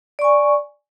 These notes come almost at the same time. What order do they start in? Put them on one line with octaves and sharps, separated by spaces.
D5 C#6 G#5